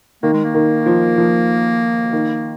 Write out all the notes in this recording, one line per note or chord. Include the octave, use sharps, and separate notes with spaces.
D#3 A#3
G#3
A#3
D#3
F3
F3
D#3